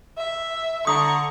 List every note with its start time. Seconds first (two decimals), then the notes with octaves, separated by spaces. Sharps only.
0.18 E5
0.87 D3 A#5 C#6 D#6